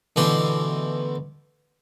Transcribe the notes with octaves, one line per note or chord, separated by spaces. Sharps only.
D2 B2 E3 G4 C6